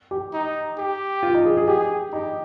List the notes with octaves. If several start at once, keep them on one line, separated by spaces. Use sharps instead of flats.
G4
D#4
G4
F4
D#4
G#4
G#4
G4 G#4
D#4 G4